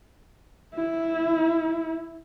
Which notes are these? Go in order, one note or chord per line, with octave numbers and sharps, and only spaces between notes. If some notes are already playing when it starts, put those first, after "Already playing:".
E4